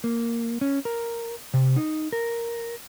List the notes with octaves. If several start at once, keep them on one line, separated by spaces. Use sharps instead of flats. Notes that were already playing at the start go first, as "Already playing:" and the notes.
A#3
C#4
A#4
C3
D#4
A#4